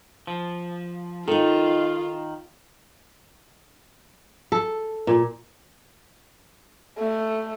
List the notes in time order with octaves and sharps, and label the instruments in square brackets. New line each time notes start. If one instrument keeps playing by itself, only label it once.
[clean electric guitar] F3
[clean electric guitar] D#3 [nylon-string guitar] D#4 A4 [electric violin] F4
[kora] A4
A#2
[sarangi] A3